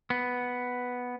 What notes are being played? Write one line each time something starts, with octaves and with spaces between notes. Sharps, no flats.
B3